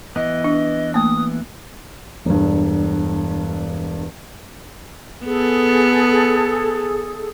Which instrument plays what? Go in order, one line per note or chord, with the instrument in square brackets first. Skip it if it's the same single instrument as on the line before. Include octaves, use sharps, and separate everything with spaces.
[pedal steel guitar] E3 B3 [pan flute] D#5
[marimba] D4
[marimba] A3 A#3 [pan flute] D#6
[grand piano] E1 G2
[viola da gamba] B3 [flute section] G#4 A4